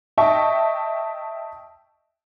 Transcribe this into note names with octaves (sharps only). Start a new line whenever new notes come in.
D#5 E5 G5 A5 C#6